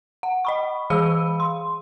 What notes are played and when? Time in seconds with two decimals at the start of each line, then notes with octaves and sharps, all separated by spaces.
0.23 F#5
0.45 D#5 B5 C#6
0.90 E3 G#4 F5 B5 E6 D#7
1.40 C6